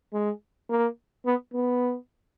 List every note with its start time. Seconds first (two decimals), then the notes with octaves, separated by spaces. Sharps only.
0.13 G#3
0.70 A#3
1.26 B3
1.54 B3